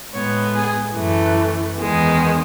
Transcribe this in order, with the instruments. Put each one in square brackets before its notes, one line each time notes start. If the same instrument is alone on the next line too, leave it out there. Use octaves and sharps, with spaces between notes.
[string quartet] A2 G#3 B3 C#5
G#4
F#2 E3 A3
E2 D#3 G#3 B3